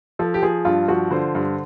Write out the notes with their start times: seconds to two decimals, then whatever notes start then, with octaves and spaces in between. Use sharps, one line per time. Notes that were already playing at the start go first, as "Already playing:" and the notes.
0.19 F3 A4
0.34 G4
0.43 F3 G#4
0.65 G2 F4
0.88 F3 F#4
1.11 D3 C5
1.35 G2